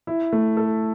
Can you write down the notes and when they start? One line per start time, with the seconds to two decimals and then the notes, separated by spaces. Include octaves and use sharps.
0.07 E4
0.33 A3
0.57 A4